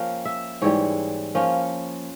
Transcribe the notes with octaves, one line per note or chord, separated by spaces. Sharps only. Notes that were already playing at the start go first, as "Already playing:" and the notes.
Already playing: F3 A#3 C#4 F5 G5
E5
G#2 E3 G3 C#5
F3 A#3 C#4 F4